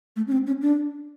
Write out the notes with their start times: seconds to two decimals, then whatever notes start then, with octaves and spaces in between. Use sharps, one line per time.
0.16 A3
0.27 C#4
0.32 C4
0.47 C#4
0.62 D4